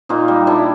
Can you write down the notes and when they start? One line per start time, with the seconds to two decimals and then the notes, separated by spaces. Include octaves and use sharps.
0.09 A#2 D#4 F4
0.28 G3
0.47 A#2 D4 E4